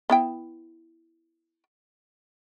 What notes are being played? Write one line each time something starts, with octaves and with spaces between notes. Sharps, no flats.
B3 E4 G5